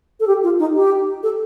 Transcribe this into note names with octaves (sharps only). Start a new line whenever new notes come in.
A4
G4
F4
D#4
G4
A4